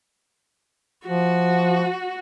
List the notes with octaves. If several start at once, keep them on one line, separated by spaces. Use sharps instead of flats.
F3 F#4